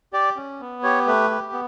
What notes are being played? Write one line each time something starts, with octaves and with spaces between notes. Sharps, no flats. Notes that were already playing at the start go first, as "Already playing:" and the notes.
G4 D5
C#4
B3
G4 C#5
A3 B4
G4
B3